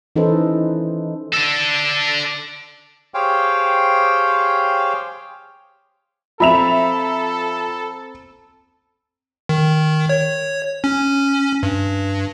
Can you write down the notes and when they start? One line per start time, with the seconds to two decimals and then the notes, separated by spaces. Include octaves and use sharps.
0.16 E3 C#4 D#4 A4 B4 C5
1.34 D4 A4
3.14 G4 G#4 C5 C#5 F5 G5
6.40 F3 C4 A4 E5 A#5 B5 F7
9.49 D#3
10.09 C#5
10.84 C#4
11.63 G2